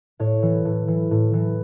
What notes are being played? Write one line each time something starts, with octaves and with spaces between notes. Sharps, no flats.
A2 C#5
E3
A2
E3
A2
E3